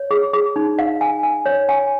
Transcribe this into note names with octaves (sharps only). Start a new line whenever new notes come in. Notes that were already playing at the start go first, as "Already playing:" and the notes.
Already playing: C#5
G#4
G#4
D#4
F5
G#5
G#5
C#5
G#5